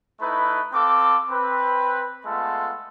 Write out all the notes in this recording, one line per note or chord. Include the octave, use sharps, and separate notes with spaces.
A3 D#4 E4 B4
C4 A4 F5 D6
C4 B4
G#3 A3 B3 F4 A4